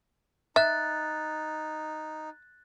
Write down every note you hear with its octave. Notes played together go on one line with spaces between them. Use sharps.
D#4 E5 F#6 A6